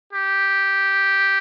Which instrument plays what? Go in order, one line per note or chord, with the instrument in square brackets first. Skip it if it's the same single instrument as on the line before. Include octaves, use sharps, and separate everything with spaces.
[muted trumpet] G4